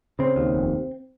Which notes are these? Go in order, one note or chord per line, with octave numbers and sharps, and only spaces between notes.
C#3 C4
D#2
F1